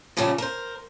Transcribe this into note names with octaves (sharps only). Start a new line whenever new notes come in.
A#2 C#3 F3 G3 A3 C#4
A#4 C5